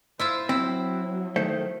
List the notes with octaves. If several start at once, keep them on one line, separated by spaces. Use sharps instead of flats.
E4 F4 C5 E5
F#3 C4 E4
D#3 A3 C5